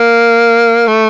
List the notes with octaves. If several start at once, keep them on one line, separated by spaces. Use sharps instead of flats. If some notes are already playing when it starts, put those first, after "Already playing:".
Already playing: A#3
A3